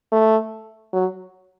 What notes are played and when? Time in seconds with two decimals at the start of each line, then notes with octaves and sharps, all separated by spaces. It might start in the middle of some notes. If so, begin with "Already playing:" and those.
0.12 A3
0.93 F#3